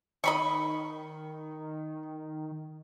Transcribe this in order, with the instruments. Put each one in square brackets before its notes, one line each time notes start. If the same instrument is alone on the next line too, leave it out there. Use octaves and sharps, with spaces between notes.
[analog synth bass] D#3 [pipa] D#5 B5 C#6